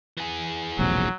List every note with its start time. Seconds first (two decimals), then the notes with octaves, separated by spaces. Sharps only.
0.17 E3 G#4
0.79 E1 A#1 C3 F#3